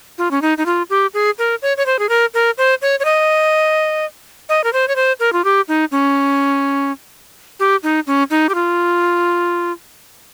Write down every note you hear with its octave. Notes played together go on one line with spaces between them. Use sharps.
F4
C#4
D#4
D#4
F4
G4
G#4
A#4
C#5
C#5
C5
G#4
A#4
A#4
C5
C#5
C#5
D#5
D#5
A#4
C5
C#5
C5
A#4
F4
G4
D#4
C#4
G4
D#4
C#4
D#4
G4
F4